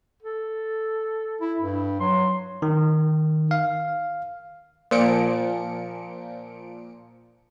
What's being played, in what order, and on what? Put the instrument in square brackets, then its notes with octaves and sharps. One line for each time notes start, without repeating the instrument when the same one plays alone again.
[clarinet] A4
[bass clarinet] E4
G2
[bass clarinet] F#3 [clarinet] C6
[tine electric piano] D#3
F5
[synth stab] A#2 F3 C#7 D7